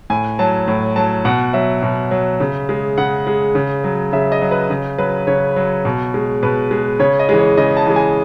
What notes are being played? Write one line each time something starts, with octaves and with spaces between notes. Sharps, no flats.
A2 G#5
F#3 A5
A2
F#3 A5
B2 F#5
F#3 E5
B2
F#3
C#3
G#3
C#3 F#5
G#3
C#3
F#3
C#3 E5
D#5
F#3
B4
C#3
F#3 B4
C#3 C#5
F#3
B2
G#3
B2 B4
G#3
C#3 C#5
D#5
E3 G#3
C#5
C#3 D#5
A5
E3 G#3
G#5